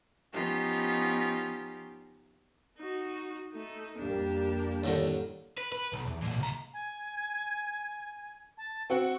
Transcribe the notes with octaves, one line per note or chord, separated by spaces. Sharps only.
F3 B3 C#4 D#4 F4 G4
D#4 F#4
A3 D#4
F2 G3 A#3 D4 G4
D#2 A2 D3
B4
B4
B1
E2
B1 A#2
C#2 A#5
G#5
A5
C4 F#4 F#5 C#6